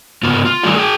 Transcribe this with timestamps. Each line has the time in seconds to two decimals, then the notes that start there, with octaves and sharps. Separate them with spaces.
0.23 G#2 C#3 B3 F4
0.45 F4
0.63 D#3 G3 A3 G#4 D5 F5
0.76 G#4 G5